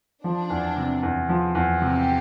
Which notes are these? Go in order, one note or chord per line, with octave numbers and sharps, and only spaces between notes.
F3 D4
E2
C3
E2
F3
E2
C3 G4